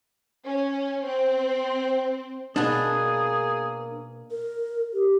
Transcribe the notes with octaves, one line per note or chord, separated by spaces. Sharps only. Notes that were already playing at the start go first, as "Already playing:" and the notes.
C#4
C4
B2 A#3 B3 D4 G#4
A#4
G4